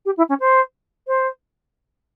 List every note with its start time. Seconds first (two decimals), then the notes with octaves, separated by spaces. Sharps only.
0.05 G4
0.17 E4
0.29 C#4
0.40 C5
1.07 C5